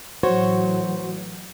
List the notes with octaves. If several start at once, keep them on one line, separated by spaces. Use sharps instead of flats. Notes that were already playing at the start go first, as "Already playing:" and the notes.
A2 E3 F#3 F#4 C5 C#5